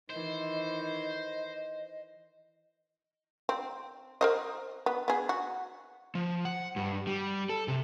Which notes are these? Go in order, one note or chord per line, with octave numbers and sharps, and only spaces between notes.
D#3 E3 C5 D#5
C4
A#4 C5 D#5
B3
B3 G#4
F#4
F3
F#5
G2
G3
A4
C3